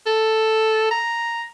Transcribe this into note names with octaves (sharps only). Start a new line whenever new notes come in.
A4
A#5